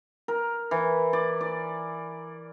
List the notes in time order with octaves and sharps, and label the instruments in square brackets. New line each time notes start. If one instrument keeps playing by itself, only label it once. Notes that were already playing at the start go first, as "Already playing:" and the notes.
[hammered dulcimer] A#4
E3
D5
D5